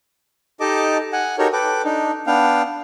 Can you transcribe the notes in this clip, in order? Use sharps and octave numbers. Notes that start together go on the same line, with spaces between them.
D#4 G4 A4 D#5 A5 D6
F#5 G#5
D#4 F#4 G4 A4 A#4 C#5
A4 B4 G5 D6
D4 D#4
B3 D4 F5 G5